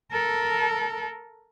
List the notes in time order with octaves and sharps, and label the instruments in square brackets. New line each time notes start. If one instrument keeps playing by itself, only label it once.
[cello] A4 A#4